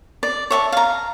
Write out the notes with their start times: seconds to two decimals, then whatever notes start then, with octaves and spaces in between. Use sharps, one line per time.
0.23 D5
0.51 C#5 E5 A5
0.72 F5 A#5